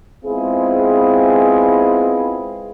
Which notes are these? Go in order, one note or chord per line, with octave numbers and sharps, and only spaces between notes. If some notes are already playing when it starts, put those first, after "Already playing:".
G#3 B3 C4 E4 F4 G#4